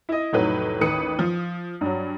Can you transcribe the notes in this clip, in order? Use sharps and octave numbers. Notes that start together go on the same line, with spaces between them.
E4 D#5
F1 A2 F#3 D#4 B4
A1 D#2 B4 D#6 C#7
F3
G2 F#3